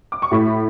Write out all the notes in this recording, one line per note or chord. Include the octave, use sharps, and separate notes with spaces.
D6
C#6
A2 B5